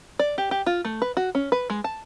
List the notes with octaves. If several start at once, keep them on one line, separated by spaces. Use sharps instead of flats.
D5
G4
G4
F4
A3
B4
F#4
C#4
B4
G#3
A5